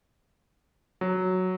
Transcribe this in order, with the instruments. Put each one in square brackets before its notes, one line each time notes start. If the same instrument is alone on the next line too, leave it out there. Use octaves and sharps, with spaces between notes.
[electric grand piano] F#3